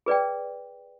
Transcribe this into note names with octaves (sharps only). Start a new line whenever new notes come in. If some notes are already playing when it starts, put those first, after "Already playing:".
G#4 B4 D5 G5